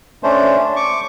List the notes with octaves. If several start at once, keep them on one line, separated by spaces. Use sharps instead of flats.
A3 C#4 D4 C5
C#6 D6